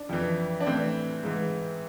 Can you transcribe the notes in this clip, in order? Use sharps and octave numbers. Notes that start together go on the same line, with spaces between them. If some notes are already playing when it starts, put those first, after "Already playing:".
Already playing: D4
F2 E3
D4
A2 E3 C4
G#2 E3